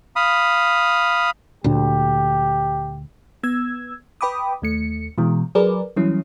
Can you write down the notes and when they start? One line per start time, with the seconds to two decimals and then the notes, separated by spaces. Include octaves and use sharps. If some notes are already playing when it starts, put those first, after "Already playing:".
0.16 F5 B5 D#6
1.64 D2 A#2 D4 G4
3.43 B3 E6 G#6
4.21 B4 G5 B5 D6 D#6
4.62 D#2 A3 C#7
5.18 B2 E3 G#3
5.55 F#3 G#4 A#4 B4 D5
5.96 E3 F#3 G3 C#4 E4